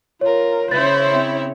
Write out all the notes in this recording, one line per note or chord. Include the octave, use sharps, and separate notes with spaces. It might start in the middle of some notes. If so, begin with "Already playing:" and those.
F4 A#4 C#5
C#3 E4 C5 C#5 A6
C4